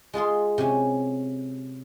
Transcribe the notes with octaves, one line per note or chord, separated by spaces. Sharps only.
G#3 F4 G#4 C6
C3 C#4 G#5